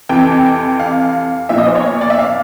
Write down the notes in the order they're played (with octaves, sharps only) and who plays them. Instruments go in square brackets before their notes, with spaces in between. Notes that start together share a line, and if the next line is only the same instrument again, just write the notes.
[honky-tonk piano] F2 C3 E3 G5
F5
B1 A#2 F3 E5
D#5
C5
C#5
C#5
D5
E5
F5